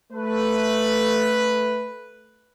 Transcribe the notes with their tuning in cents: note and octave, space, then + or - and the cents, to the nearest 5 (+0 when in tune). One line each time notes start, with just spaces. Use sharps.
A3 +0 B4 +0